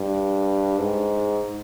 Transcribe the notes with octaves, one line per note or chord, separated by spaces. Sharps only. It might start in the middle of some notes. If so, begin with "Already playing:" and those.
Already playing: G2
G#2